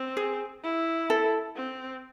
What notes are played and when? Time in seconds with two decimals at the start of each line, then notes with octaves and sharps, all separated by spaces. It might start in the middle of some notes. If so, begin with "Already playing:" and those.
Already playing: C4
0.17 G#4
0.63 E4
1.10 A4
1.56 C4